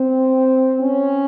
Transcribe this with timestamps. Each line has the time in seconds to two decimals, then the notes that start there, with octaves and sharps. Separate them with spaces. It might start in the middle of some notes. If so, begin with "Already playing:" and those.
Already playing: C4
0.82 C#4